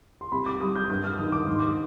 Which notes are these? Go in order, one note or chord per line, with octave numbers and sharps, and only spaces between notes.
C6
C2 B5
D6
G3 D#6
G6
G2 G6
F6
D#3 D#6
D6
G#2 C6
D6